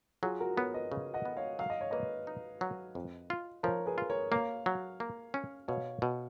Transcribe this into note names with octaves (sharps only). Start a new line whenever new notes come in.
F#3 F4 G#4
F#4 A#4
B3 A#4 C#5
B4 D#5
C#3
D#5 F#5
B3
C#5 F5
F#3 F5
D#5
C#5
A#3 B4 D#5
D#4
F#3
F2
F4
F3 A#4 C#5
G#4 B4
F4
A#4 C#5
A#3 C#5 F5
F#3
A#3
C#4
B2 C#5 F5
B2